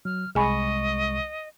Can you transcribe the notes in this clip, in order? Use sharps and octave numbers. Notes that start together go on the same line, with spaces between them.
F#3 F6
C2 G#3 G#4 D#5 G#5 B5 C#6